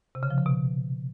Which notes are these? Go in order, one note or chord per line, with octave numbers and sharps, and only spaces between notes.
C3
C#3
F3
C#3
B2